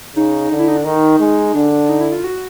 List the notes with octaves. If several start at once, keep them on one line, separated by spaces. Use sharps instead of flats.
C#3 D#4
D3
E4
D#4
D4
D#3 D#4
G#3
D3 D4
D4
D#4
E4
F4
F#4